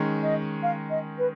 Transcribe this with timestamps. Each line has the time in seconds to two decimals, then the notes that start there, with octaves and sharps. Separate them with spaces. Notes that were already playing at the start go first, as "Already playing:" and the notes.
Already playing: D#3 G#3 C#4
0.22 D#5
0.63 F5
0.90 D#5
1.18 B4